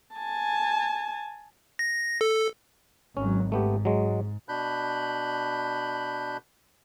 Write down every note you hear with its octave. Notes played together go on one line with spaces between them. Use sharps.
G#5 A5
A#6
A4
G#1 F#3 C#4
G#2 A3 B3 G4
F#3 G#3
B2 D4 B5 F#6 G6